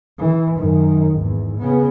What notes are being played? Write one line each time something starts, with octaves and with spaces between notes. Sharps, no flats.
E3
F#2 D#3
G#1 E2
C#3 B3